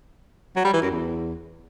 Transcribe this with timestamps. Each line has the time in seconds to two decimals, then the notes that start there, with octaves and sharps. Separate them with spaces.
0.56 F#3
0.65 G3
0.74 E3
0.82 F#2
0.91 E2